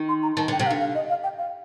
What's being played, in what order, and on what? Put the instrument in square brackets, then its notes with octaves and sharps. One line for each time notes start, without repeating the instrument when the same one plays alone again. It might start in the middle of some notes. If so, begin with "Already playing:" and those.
Already playing: [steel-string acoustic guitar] D#3
[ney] C6
A#5
[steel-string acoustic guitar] D#3 [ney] A5
[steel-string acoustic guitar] D3 [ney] G5
[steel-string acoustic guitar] C3 [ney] G5
[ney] F5
[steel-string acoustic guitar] D3
[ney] F5
D#5
F5
G5
F5